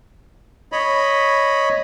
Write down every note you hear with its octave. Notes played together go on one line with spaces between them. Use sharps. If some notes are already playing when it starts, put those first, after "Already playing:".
C#5 D#5 B5